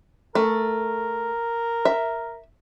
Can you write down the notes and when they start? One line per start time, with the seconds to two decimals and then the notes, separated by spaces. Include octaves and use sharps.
0.35 A3 A#4
1.85 E5